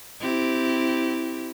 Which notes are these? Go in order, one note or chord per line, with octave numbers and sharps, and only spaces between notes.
C4 E4 G4